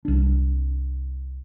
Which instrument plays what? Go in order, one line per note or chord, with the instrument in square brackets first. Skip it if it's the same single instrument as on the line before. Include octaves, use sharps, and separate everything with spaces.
[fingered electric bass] C2 D4